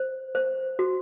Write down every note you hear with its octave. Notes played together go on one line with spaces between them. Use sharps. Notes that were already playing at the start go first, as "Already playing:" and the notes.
Already playing: C5
C5
F#4